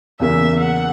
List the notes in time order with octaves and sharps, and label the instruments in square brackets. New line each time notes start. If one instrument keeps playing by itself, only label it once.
[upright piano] E2 C#3 E3 A#3 [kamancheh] E5
[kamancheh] F#5